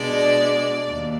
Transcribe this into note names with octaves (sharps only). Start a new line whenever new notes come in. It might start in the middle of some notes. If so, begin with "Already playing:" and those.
Already playing: B2 G#3 D4 D5
D#2